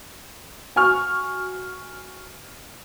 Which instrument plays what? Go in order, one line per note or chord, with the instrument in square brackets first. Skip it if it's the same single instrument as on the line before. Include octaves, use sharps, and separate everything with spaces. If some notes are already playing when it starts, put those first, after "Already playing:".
[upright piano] F#4 G#5 C#6 F6